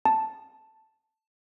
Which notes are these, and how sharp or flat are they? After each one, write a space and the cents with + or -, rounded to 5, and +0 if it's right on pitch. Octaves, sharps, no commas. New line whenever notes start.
A5 +0